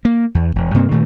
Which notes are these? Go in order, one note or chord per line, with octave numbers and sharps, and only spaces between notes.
A#3
E2
E1
G2 C3 A#3 C4
G2 A#2 D#3 A3